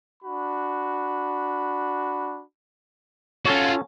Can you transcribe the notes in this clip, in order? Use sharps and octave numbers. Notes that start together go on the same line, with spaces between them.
D4 F#4 B5
C#4 F4 F#4 A4 C#5